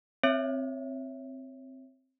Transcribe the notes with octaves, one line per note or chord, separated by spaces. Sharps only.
C4 C#5 E5